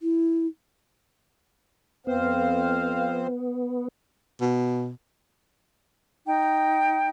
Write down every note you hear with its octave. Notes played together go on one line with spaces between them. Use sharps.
E4
F2 B3 C4 C5 F5
B2
D#4 G5